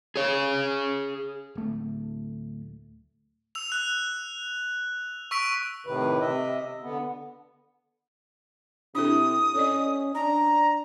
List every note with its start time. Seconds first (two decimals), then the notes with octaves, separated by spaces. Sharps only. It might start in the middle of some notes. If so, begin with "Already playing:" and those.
0.16 G#4 C#5
1.55 D1 A3
3.55 E6 F7
3.70 E6 F#6 F7
5.31 C#6 E6 B6 D7
5.86 A2 C3 D#3 B4
6.21 C3 D#5 E5
6.82 D3 B3
8.95 C3 D4 E4 A4 D#6
9.55 C#4 A4 D5 D#5
10.15 D4 A#5